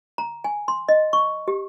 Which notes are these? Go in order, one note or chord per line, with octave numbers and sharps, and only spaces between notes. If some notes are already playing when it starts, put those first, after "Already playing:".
A#5
G#5
C6
D#5
C#6
G4